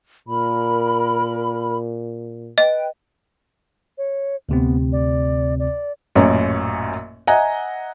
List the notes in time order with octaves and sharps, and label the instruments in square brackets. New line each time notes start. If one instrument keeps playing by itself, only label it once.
[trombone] A#2 [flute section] A#4 B5
[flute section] B4 G5 [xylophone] D#5
[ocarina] C#5
[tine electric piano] D2 C3 C4 [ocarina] B3
[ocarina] D5
D5
[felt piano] A1 F#2 A#2 C#4
D#5 E5 F#5 G#5 A#5